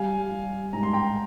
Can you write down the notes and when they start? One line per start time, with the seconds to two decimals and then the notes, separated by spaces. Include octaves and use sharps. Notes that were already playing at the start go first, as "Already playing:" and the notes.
Already playing: G3 F5 G#5
0.31 G3
0.73 G#2 A#5
0.83 C6
0.93 G5 A#5